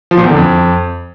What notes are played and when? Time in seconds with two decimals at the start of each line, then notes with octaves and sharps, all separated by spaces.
0.11 F3
0.17 A#2
0.24 E2
0.30 D3
0.36 F2